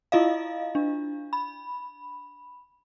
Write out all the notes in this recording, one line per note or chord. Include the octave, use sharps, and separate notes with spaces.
E4 F4 D#5 F5
D4
B5